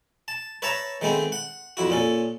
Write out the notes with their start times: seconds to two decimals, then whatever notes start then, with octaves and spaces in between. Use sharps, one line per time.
0.28 A5
0.62 B4 C#5 E5 A5 A#5 C#6
1.01 D#3 G#3 A3 B3 C4
1.32 F#5
1.77 F2 E4 F#4
1.90 A#2 C#4 A4